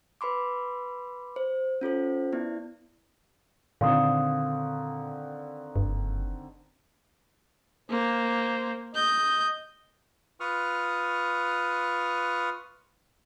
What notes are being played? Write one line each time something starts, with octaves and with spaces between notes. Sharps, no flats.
B4 B5 C6 D6
C5
C#4 F4 A4 C5
B3 E4 D5
A#2 D3 D#3 C4 F5 C6 D#6
F#1 G2
A#3 C5
D#5 G6
F4 B4 C#6 D#6 F6